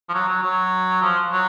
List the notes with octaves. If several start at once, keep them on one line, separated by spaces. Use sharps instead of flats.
F3
F#3
F#3
F#3
F3
F#3